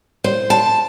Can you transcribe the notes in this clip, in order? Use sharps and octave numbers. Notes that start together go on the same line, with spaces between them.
C5
A5